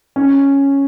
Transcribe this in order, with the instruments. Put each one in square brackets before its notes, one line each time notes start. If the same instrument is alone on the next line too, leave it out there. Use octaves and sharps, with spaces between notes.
[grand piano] C#4